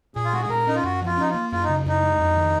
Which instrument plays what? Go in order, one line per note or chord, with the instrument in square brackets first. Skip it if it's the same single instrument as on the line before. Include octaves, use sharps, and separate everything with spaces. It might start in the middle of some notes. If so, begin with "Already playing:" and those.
[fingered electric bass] A#2 [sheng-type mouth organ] G#4
[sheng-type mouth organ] F4
[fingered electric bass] G#3 [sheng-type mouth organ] F#4
[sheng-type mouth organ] G#4
[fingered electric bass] A#2 [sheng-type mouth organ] A#4
[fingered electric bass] C#4 [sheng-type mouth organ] D#4
[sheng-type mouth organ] F4
[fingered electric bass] F#2 [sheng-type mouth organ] F#4
[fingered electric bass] F3 [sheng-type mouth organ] F4
[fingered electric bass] C#4 [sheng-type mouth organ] D#4
[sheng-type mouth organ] F4
[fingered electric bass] A#3
[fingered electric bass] F#2 [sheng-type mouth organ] F4
[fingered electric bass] C#3 [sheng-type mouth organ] D#4
[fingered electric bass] F#2 [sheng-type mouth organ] D#4
[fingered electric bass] G#3
F2
D#3